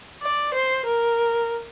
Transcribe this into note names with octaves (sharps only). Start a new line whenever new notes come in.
D5
C5
A#4